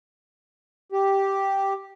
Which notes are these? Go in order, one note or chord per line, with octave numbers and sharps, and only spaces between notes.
G4